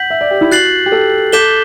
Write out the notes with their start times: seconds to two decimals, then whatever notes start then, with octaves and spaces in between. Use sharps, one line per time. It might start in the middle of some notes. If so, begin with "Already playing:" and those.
Already playing: F#5 G6 B6 F#7
0.10 E5
0.21 D5
0.31 G4
0.41 E4
0.51 F#4 F#6 A6 C7 F#7
0.86 G4
0.92 A4
1.32 A4 D6 G6 B6 E7 G7